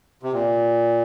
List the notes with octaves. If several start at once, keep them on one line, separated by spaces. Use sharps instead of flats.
C3
A#2